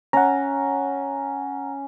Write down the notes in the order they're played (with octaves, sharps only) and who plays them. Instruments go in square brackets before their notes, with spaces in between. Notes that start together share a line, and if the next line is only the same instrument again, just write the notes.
[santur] C#4 [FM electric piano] F#5 A#5